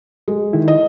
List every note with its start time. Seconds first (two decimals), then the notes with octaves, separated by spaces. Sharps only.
0.28 G#3
0.53 D#3 D#4 E4
0.68 D#5